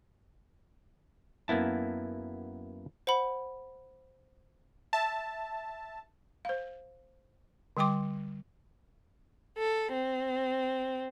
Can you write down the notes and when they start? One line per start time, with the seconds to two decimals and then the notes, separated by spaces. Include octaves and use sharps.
1.48 F#2 A#3 B3 E4 A5
3.07 C5 F#5 B5
4.93 E5 A5
6.45 C5 F5
7.77 D3 G3 G5 C6 D6
9.58 A4
9.92 C4